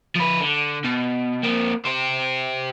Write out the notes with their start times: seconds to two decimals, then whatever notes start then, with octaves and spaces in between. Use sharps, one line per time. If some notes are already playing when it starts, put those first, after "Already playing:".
0.16 F3 B4
0.41 D3
0.84 B2
1.43 A#3 C4
1.85 G4 C5